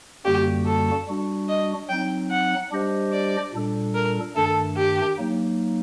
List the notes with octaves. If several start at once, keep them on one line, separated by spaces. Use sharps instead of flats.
F#2 D3 G3 A#3 F#4 G4
A4
G3 D4 F#4
D#5
F#3 C4 D#4 G5
F#5
G3 D4 G4 C5 D#5
D5
A#2 G3 D4 A4
A#4
G2 D#3 A3 D4 A4
G4
F#3 A#3 D#4